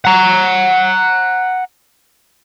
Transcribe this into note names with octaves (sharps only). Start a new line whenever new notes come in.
F#5 A#5